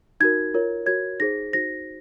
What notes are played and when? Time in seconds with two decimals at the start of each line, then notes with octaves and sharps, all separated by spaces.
0.20 D#4 F#4 A#4 G#6
0.54 F4 A#4 C#5
0.86 F#4 A#4 C#5 G#6
1.20 D#4 G#4 C5 A#6
1.53 D#4 F#4 C5 A#6